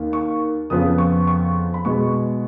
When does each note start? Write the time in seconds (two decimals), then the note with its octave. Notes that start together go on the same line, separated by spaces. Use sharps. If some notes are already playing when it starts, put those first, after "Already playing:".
Already playing: D#2 D#3 A#3
0.13 C#6
0.70 F2 C#3 F3 B3 D#6
0.98 C#6
1.27 C#6
1.74 B5
1.85 B2 G#3 B3 C#6